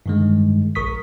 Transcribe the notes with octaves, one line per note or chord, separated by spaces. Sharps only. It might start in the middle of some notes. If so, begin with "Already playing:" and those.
G2 D#3 G#3
A#1 A#4 C#6 D#6 B6